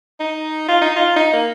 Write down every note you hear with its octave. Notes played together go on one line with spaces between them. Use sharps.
D#4
F4
D#4
F4
D#4
A#3